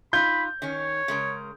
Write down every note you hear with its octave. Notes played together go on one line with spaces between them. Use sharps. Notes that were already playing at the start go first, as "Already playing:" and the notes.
D#4 F4 B5 G6
D#3 C#4 C#5
C#3 G#3 A#4